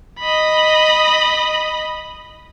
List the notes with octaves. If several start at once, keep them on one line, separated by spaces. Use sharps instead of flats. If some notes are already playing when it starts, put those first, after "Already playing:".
D#5 B5